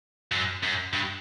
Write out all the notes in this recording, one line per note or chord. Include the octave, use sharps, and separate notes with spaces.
F#2
F#2
G2